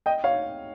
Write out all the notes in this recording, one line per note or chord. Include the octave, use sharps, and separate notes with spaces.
D#5 G5
C#5 F5